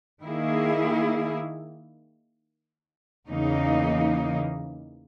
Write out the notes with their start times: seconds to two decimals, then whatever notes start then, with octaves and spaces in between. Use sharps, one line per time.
0.22 D#3 A#3 E4 G#4
3.29 E2 C#3 E3 A#3 D#4